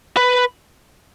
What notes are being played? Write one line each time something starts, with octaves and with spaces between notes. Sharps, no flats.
B4